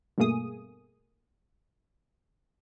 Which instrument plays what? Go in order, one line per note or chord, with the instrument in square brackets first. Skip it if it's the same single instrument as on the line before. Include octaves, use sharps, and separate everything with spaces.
[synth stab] G2 B2 A3 A#3 G#4 D#6